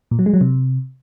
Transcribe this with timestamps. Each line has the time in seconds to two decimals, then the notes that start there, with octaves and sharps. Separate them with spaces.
0.11 A#2
0.19 F#3
0.26 G#3
0.34 F#3
0.41 C3